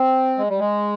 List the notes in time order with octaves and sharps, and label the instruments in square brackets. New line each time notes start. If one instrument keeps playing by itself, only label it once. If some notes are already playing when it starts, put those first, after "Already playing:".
Already playing: [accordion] C4
G#3
G3
G#3